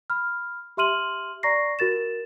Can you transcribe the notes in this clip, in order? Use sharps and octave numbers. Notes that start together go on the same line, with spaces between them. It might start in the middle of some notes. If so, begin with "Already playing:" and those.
B5 F6
G4 E5 C6 F6 D#7 F#7
D5 A#5 C#6 A#6 C7
F#4 A#4 A6 E7